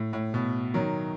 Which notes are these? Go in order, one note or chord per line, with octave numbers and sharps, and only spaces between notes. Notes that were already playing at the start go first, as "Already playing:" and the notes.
Already playing: A2
A2
B2
D#3 F#3